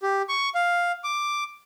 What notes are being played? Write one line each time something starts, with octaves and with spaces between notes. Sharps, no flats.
G4
C#6
F5
D6